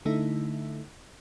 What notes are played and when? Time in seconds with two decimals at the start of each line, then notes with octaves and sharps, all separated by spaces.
0.05 D3 A3 D#4 E4